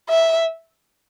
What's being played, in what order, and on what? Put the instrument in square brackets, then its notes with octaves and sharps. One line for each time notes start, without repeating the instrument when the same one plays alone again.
[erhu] E5